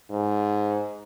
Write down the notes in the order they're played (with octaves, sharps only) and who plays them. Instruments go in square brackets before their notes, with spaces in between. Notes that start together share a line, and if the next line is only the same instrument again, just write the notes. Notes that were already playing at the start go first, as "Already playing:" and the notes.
[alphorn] G#2